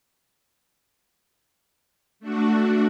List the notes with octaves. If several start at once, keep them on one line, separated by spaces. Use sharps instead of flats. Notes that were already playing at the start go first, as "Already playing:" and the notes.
A3 D4 F#4